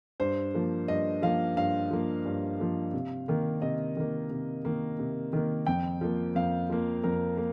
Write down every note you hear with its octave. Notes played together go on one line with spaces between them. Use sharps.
G2 C5
F3 A#3
G2 D#5
F3 A#3 F5
G2 F5
F3 A#3
G2
F3 A#3
C3
D#3 A#3
C3 D#5
D#3 A#3
C3
D#3 A#3
C3
D#3 A#3
F2 G5
F3 A#3
F2 F5
F3 A#3
F2 A#4
A#3